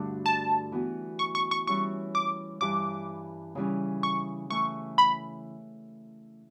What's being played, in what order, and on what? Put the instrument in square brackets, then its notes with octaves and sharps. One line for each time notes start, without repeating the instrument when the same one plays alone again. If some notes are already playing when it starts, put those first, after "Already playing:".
Already playing: [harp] G2 D3 A3 D4 F#4
[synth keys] A5
[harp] E3 B3 F#4
[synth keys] C#6
C#6
C#6
[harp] E3 G3 C#4 E4 [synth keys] C#6
[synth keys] D6
[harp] G2 E3 G3 [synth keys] D6
[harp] C#3 E3 G3 C#4
[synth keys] C#6
[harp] E3 A3 E4 [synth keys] C#6
[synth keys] B5